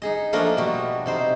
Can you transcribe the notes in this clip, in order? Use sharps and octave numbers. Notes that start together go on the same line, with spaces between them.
D#4 G#4 D#5
F3 A3 A#3 D4 A#4 D#5
B2 G3 F#4
C3 D#4 C5